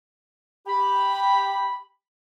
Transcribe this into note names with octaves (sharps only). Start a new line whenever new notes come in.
G4 B5